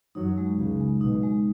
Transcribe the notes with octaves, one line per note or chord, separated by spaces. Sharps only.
F#2 F#3 D#4
G#3
C#2 C#3 F#4
G#3
B1 B2 D#4
G#3